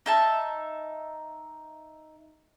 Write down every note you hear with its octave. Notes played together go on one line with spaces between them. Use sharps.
D#4 E5 A5